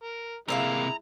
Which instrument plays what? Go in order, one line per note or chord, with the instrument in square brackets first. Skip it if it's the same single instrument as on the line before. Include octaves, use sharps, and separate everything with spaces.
[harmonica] A#4
[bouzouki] A2 E5 F5 [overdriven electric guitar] C3 A#3 [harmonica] G#3 E4 [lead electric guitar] A#5